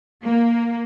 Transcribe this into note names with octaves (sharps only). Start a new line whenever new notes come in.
A#3